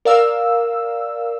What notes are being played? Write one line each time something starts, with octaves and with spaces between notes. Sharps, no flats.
A#4 D5 F5 E6